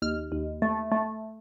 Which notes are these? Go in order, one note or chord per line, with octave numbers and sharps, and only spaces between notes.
D#2 F6
D#2
A3
A3